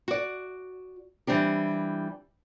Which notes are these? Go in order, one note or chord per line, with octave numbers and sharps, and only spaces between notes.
F#4 D5
E3 G3 C4 D4 G4